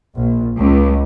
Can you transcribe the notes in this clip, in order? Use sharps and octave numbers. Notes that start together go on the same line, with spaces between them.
A#1
C#2